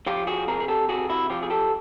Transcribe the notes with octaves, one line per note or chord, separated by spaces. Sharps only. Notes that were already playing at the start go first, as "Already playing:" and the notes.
F3 F4 G4
F#4 G#4
C3 G#4 A#4
G#4
G4 A4
C3 F#4 G#4
E4 F#4
F3 F4 G4
G#4
G4 A4